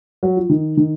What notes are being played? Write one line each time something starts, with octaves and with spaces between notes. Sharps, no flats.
F#3
F3
D#3
D#3